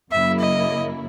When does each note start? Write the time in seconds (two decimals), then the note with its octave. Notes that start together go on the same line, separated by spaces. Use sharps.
0.11 F#2 C#3 F#3 A#3 E4 E5
0.40 D#5